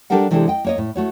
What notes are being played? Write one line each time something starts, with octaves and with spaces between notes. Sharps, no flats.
G3 D4 G4 A4 A#4 F#5
C3 E3 G#3 D4 G4 A4
D#5 G5
A#3 C#5 D#5
A2
A3 F#4 C#5